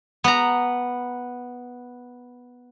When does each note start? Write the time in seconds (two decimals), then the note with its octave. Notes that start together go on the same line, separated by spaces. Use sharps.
0.24 B3 A#5